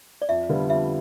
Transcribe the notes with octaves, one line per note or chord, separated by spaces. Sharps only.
D5
F2 E5
D3 G3 B3 F4
F2 E5